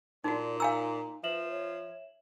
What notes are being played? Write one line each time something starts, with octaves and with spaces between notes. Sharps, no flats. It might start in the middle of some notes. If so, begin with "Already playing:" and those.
A#2 D#4 F#4 D5
D#4 F5 G#5 A#5 E6
F3 B4 E5 E7 F#7
C#5